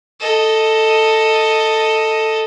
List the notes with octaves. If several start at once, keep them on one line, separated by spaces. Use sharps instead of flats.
A4 D#5